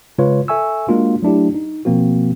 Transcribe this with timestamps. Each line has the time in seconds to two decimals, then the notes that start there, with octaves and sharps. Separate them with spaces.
0.18 C#3 G#3 F4 B4 C#5
0.48 A4 E5 G#5 C#6 E6
0.88 G#3 A#3 D4 F4 F#4
1.22 F#3 A3 D4 E4 G4
1.55 D#4
1.85 B2 F3 A#3 C4 F#4